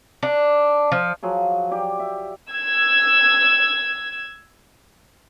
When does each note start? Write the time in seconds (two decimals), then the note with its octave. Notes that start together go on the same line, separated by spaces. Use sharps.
0.23 D4
0.92 F3
1.23 F3 F#3 G#4
1.71 G4 D5
1.99 E5
2.51 E6 G#6